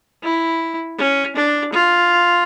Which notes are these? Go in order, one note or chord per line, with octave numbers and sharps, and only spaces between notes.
E4
C#4
D4
F4